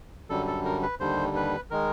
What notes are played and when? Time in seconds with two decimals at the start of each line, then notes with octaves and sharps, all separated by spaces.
0.30 F#2 D3 G3 A4
0.47 A4
0.65 A#4
0.83 B4
1.00 D#2 D3 G3 C5
1.36 B4
1.71 D#3 G#3 A#4